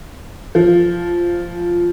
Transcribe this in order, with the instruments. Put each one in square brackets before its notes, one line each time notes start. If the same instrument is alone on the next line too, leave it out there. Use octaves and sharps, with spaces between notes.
[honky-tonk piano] F3